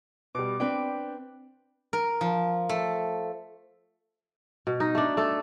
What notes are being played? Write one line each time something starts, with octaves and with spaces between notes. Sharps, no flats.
B2 G3 D6
C4 D4 B4 G5
A#4
F3
A3
B2
D#4
A3 D4
A3 A4